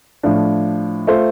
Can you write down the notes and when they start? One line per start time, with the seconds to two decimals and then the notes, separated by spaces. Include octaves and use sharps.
0.23 A2 F3 D4
1.07 A3 F4 C5